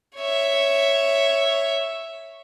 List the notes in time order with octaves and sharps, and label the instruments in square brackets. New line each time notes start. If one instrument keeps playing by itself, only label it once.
[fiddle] C#5 E5